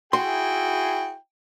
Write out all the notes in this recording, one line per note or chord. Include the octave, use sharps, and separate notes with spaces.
E4 F#4 G#4 G5 C6